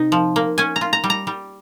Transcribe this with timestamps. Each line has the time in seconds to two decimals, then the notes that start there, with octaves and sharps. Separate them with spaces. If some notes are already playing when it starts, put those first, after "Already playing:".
Already playing: C3 D#4
0.12 F3
0.36 A#3
0.58 C#4 G#5
0.76 A#5
0.81 F4
0.93 A#5
1.04 G3
1.10 A#5
1.27 G3